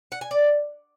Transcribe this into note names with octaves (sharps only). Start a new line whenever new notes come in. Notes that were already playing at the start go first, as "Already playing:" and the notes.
F#5
G#5
D5